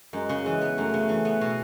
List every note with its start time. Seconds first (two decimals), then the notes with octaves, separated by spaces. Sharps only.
0.13 F#2 G#3
0.29 C#3
0.45 E3 G#3
0.61 B3
0.77 F#2 A3
0.94 C#3
1.09 E3
1.25 B3
1.41 B2